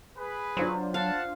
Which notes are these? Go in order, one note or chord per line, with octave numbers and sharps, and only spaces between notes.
G#4 B4
F#3 D4 F4 C5
F5 F#5 A5